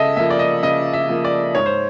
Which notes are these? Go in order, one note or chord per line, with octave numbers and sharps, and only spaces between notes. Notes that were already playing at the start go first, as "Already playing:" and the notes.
Already playing: C#3 A4 D#5 E5
F3 A#3 E5
D5
D#5
C#3 D#5
E5
F3 A#3
D5
G#2 C#5
C5